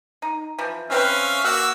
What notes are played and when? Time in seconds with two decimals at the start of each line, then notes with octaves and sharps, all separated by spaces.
0.22 D#4
0.59 E3 F3
0.90 E3 C4 C#4 B4 E5 F5
1.44 A#3 F#4 F#5 E6